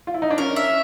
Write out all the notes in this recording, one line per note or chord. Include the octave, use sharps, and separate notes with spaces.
F4
E4
D#4
D4
C#4 A#4
E5